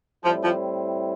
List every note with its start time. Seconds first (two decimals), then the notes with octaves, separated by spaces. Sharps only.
0.24 A2 F3 G3 C4 E4
0.44 F3